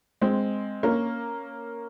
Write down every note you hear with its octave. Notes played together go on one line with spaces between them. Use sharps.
G#3 C4
A#3 C#4